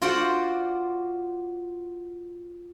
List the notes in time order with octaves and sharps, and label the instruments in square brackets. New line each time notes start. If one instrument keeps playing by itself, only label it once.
[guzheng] F4 F#4 C5 D5 F#5